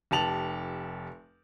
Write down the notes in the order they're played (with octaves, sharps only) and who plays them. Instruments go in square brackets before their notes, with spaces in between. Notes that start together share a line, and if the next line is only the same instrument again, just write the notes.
[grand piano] F1 G4 A5 F7 F#7